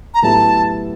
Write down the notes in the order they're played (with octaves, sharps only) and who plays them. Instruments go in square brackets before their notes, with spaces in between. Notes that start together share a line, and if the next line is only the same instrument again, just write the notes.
[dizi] A#5
[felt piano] A2 F#3 B3 E4 G4 [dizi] A5